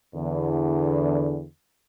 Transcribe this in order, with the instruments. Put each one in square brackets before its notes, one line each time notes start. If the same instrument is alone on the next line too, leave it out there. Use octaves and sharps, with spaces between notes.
[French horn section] E2 D3